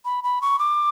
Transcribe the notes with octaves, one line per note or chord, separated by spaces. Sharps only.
B5
B5
C#6
D6